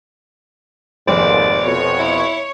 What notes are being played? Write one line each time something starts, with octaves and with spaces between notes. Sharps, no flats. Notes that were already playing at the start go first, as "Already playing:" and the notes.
F1 D#2 G#2 C5 D5
F2 B2 C#5
E4